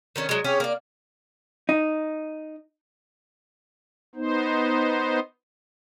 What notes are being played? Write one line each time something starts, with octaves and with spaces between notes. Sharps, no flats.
D#3 A3 C#4
F#3 G#3
C#4 G4 G#4 C#5
A#3 D5
D#4
B3 D#4 C5